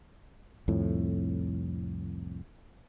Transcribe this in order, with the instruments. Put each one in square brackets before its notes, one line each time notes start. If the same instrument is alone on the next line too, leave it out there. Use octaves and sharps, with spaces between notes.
[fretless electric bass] C2 F2 A2